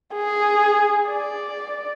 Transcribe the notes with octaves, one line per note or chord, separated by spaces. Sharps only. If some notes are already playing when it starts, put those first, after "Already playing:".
G#4
D5